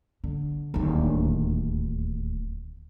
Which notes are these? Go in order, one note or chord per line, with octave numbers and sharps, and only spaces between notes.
D3
D1 D#2